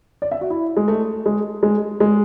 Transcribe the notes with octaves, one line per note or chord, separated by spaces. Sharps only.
D5
E5
F#4
E4
G#3
A3
G#3
G#3
G#3